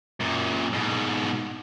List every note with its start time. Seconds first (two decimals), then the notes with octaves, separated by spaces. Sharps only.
0.20 F#2 A#2
0.73 G#2 B2